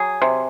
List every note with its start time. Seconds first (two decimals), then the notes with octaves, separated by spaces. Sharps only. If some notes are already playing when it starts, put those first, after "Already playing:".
Already playing: F#3 G#4
0.22 C3